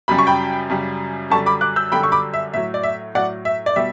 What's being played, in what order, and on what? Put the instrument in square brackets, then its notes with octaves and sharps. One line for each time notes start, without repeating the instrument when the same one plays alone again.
[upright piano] F#2 C#3 G3 B5
C#6
G5 B5
F#2 C#3 G3
F#2 D3 G3 A5 C#6
B5 D6
D6 F#6
E6 G6
F#2 D3 G3 G5 B5
C#6
B5 D6
E5
A2 F#3 E5
D5
E5
A2 F#3 D5 F#5
E5
D5
B2 G3 E5